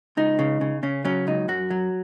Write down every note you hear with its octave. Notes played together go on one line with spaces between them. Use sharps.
C#2 D#4
C#3
C#3
C#3 C#4
F#3 C#4
C#2 D#4
F#2 F#4
F#3